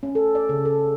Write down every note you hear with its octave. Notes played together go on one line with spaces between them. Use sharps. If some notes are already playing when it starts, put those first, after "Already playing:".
C#4
A4
D5
C#3
A4